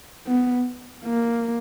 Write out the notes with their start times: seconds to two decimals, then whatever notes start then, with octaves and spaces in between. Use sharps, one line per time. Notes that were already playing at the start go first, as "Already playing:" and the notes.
0.27 B3
1.05 A#3